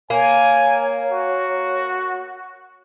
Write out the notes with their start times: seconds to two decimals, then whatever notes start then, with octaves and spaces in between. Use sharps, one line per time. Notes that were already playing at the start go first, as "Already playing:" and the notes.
0.10 A#3 C#5 G#5
1.11 F#4